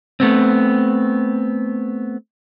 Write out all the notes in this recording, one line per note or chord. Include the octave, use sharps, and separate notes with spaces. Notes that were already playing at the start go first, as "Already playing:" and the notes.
A3 B3 C4